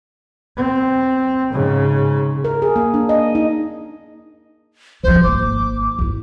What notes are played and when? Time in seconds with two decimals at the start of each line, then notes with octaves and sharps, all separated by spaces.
0.57 C4
1.52 G#2 C#3
2.44 A#4
2.62 G#4
2.76 A#3
2.94 D4
3.09 D#5
3.35 D#4
5.04 G1 F3 C5
5.23 G#1 A#3 D6
5.99 G#1 E4